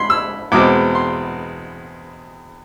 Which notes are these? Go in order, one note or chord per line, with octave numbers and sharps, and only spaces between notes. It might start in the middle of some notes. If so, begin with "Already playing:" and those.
Already playing: B5 C6
E6
E2 B2 G#3 C4 D6
C6